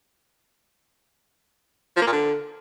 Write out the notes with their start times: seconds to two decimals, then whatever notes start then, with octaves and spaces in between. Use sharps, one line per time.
1.97 F3
2.02 A#3
2.07 A#2
2.12 D3